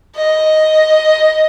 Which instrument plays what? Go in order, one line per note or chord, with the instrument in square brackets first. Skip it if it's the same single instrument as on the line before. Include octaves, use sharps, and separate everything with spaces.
[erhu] D#5